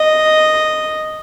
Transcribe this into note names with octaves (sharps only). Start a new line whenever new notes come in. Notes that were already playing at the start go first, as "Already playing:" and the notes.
Already playing: D#5